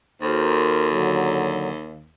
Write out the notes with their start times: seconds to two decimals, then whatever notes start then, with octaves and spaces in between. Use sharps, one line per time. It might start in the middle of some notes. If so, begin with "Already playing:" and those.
0.22 D#2 F#4 A4 A#4 C5
0.91 D3 F#3